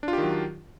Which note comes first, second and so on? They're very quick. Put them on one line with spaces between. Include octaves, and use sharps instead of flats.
D4 F4 G4 D#3 F#3